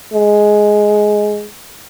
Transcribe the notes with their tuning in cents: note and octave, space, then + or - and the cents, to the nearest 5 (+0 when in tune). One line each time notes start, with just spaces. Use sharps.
G#3 +10